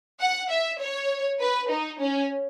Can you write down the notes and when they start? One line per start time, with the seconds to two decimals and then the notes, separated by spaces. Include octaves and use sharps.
0.20 F#5
0.50 E5
0.79 C#5
1.39 B4
1.69 D#4
1.99 C#4